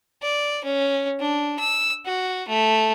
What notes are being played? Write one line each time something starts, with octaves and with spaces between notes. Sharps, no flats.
D5
C#4
D4
E6
F#4
A3